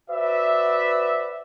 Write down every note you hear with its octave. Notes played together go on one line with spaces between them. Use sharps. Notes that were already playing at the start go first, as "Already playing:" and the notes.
F#4 B4 C5 D5 E5